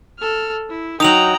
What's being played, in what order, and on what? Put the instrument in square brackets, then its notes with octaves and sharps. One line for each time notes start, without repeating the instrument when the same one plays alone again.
[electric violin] A4 F6
E4
[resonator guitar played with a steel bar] F#3 D#4 [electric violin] G5 A#5 [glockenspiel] D#6 F7 F#7